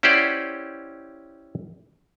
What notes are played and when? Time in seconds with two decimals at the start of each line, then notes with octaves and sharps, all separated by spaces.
0.03 C#4 E4 G4 C5 D5 F#5